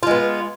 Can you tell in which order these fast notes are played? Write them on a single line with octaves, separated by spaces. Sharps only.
F4 G#3 B3